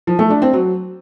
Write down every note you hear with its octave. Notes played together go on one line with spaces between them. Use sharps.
F3
A3
D4
C4
F#3